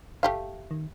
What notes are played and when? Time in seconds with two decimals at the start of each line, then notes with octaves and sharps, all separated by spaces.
0.23 F#1 A3 G4 F5
0.71 D#3